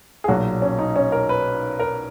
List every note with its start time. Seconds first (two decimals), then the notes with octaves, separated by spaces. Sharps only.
0.24 G#4
0.28 B1 A#2 F#3 F#4
0.62 C#4
0.79 D#4
0.96 C#4
1.12 A#4
1.29 B4
1.79 A#4